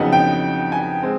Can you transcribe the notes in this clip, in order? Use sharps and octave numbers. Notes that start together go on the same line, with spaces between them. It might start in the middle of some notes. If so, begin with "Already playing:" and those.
Already playing: F2 C#3 F#3 B3 D#4 F#5
G5
G#5
G#3 C4